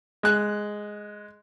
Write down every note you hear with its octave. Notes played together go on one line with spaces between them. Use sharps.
G#3 F#6